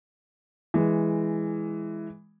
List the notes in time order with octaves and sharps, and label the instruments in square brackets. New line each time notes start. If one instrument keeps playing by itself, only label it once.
[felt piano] E3 G#3